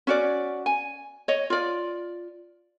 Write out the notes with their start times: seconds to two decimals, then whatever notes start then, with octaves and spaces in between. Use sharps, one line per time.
0.07 C#4 F#4 D5
0.66 G#5
1.28 C#5 D#5
1.50 F4 D5